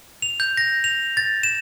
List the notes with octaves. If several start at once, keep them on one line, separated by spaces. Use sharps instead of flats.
F7
G6
A#6
F7
A6
E7